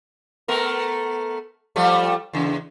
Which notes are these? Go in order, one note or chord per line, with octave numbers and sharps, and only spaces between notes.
A3 B3 A#4
F3 G3 A3
E2 C#3